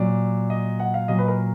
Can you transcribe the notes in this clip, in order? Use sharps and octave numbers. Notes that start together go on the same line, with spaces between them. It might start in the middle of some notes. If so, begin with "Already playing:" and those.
Already playing: A#2 F#3 D5
D#5
F#5
F5
A#2 F#3 D#5
B4
A#4